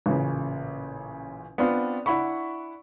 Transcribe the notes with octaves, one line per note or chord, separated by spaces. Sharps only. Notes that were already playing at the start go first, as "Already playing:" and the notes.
A1 A#2 C#3
B3 C4 D4 F4
D4 E4 F#5 B5 C#6